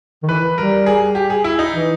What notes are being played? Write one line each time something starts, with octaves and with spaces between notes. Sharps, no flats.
D#3
E3 B4
G3 A#4
G#4
G4
G#4
E4
D#4
E3